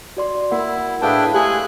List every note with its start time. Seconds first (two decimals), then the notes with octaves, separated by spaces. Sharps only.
0.17 F#4 D5 C6
0.51 A#3 E4 A#4 F#5
1.02 A2 D4 E4 G#4 B4 F5 G5 A5
1.34 G#3 A3 G4 G#4 G#5 F#6